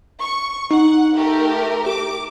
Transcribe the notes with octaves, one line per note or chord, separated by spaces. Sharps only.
C#6
D#4 F#5
A3 G4 A#4
G4 D6